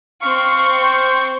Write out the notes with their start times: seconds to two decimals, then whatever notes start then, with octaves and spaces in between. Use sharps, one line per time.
0.22 C4 F5 C#6
0.83 C5